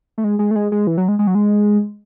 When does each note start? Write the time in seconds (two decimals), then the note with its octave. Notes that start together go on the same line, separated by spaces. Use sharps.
0.18 A3
0.24 G#3
0.39 G#3
0.51 A3
0.56 G#3
0.72 G#3
0.87 E3
0.98 F#3
1.08 G#3
1.19 G#3
1.27 F#3
1.35 G#3